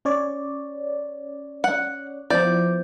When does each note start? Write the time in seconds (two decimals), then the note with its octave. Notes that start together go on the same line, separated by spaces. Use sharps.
0.05 C#4 C#5 D5
1.64 F#5
2.30 F3 B3 E4 C5 D5 G6